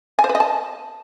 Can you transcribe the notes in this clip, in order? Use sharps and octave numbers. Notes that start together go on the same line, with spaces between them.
G#5
C5
B4
D#5
A5